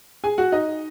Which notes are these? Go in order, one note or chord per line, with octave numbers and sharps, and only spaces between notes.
G#4 G#5
F#4 F#5
D#4 D#5